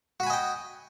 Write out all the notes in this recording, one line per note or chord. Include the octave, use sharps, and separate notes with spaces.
F#4 D#5 G5 G#5 B5